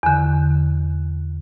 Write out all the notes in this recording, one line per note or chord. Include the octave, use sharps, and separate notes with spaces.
E2 D3